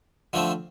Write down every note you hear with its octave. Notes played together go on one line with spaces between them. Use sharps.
D3 F3 A3 C4